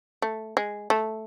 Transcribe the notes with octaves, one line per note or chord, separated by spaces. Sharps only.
A3
G#3
A3